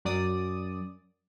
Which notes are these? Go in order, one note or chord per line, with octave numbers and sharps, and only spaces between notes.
F#2 D5 D#6